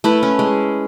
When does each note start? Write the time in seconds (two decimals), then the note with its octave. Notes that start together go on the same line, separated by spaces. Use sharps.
0.04 A3 E4 B4
0.23 C#4
0.39 G#3